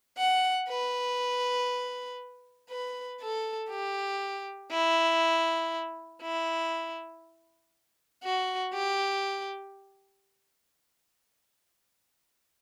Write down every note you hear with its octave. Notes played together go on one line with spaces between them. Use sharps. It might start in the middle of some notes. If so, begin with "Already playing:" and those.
F#5
B4
B4
A4
G4
E4
E4
F#4
G4